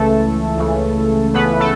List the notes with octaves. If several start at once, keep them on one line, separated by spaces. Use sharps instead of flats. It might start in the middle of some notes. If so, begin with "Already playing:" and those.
Already playing: C#2 C#3 E3 A3 A4
C#2 C#3 E3
C#2 C#3 E3 B3 B4
A3 A4